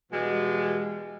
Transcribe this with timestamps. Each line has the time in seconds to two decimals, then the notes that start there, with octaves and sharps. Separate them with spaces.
0.12 B2 E3 G3 G#3